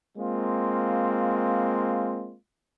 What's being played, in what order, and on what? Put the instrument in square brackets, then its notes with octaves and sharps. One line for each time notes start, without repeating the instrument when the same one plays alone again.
[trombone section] G#3 A#3 C4 F4